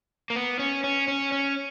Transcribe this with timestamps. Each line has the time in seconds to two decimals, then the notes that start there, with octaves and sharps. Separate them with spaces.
0.30 A#3
0.36 B3
0.59 C#4
0.84 C#4
1.08 C#4
1.32 C#4